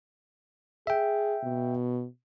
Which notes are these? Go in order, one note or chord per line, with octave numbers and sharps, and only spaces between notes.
G#4 E5 G5
B2